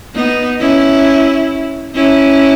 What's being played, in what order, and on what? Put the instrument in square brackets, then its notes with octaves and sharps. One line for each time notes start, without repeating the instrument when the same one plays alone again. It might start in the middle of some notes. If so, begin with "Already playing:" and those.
[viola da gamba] B3 D#4
C#4 E4
C#4 E4